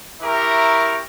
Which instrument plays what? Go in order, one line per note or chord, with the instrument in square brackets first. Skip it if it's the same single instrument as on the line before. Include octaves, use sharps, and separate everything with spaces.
[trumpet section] E4 G4 A#4 E5 A#5 C#6